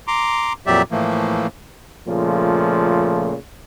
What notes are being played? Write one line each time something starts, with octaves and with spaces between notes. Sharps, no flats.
A#5 C6 D6
F2 A#2 F#3 G4 D5 E5
A2 E3 F3 A3 A#3
A#2 C#3 F3 A3